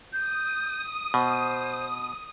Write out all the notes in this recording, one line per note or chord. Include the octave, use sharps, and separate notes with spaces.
D#6 G6
B2 C5